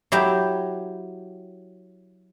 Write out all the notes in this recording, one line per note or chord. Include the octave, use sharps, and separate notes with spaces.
F#3 E4 G4